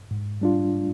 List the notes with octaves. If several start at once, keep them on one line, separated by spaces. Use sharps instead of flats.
G#2
G3 D4 F4